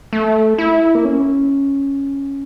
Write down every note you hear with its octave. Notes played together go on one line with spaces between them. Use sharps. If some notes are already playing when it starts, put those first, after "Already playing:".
A3
E4
A#3
C#4